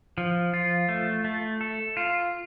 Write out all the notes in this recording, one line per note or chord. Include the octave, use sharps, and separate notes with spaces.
F3
F4
A3
A3
A4
F4